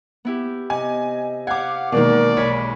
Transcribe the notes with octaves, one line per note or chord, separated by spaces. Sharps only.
B3 E4 G4
C3 D#5 G#5
G4 F5 F#5 G#5 D6
B2 D#3 E3 G#3 A#3 A#4 D5
B1 C#5 G#5 B5